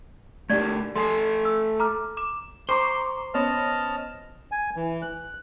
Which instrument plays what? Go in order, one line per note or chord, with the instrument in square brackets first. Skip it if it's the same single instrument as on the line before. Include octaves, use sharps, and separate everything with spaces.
[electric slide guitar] A3 D4 G4 [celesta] D5 G#6
[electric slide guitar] A3 A4 G#5 [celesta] C6
[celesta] E6
A#5 D6 F6
D6 E7
[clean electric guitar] C5 [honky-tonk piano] A#5 C#6 D6
[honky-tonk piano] B3 C#4 [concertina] D#5 A5 F6
[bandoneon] G#5
E3
F#6